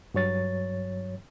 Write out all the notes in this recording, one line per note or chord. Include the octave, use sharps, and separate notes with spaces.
G2 F#3 C#5 A6